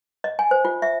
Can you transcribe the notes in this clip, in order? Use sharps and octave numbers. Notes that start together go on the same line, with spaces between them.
D#5
G#5
C5
F4
E5